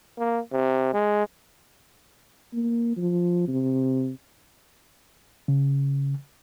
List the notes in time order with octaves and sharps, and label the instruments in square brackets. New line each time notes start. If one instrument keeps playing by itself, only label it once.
[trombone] A#3
C3
G#3
[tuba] A#3
F3
C3
[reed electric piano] C#3